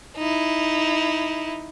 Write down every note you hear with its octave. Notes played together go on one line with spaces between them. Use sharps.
D#4 E4